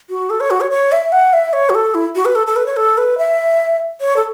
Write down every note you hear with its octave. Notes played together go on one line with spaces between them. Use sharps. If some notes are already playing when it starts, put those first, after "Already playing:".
F#4
A4
C#5
F#4
C#5
C#5
E5
F#5
E5
C#5
F#4
A4
E4
F#4
B4
A4
A4
B4
C#5
A4
B4
E5
C#5
A4